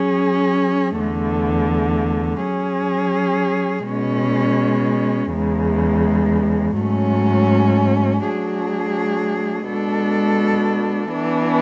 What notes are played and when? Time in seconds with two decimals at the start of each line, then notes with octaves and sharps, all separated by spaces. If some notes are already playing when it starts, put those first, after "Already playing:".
Already playing: F#3 C#4 G#4
0.97 E2 D3 A3
2.43 F#3 C#4 G#4
3.88 B2 G#3 C#4
5.34 E2 C#3 G#3
6.78 G#2 F#3 A3 C#4
8.23 F#3 A3 D4 G#4
9.69 B2 G#3 D4 A4
11.13 E3 B3 D4